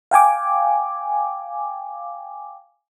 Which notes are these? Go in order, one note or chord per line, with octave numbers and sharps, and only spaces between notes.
F5 G5 G#5 D6